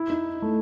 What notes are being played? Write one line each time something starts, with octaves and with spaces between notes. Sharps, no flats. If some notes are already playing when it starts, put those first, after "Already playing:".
Already playing: E4
D#4
A3